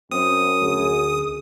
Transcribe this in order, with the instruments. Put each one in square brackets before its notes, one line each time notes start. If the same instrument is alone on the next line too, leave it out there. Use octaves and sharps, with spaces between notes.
[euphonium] F#2 [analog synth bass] C4 [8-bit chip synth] D#6
[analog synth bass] D2 [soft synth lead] G#4